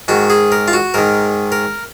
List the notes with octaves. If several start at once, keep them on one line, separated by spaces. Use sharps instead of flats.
G#2 D#3 F#4
G#4
A#4
F4
F#4
G#2 D#3 A#4
A#4